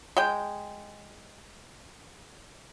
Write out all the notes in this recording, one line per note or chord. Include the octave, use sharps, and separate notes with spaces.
G#3 G5